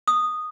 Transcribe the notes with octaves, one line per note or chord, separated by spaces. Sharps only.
D#6